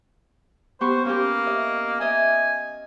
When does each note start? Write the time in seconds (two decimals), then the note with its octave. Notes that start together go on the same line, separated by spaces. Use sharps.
0.81 B3 G4 C5 C#6
1.05 A#3 C#4 G4
1.47 D#5
2.00 D#5 E5 G#5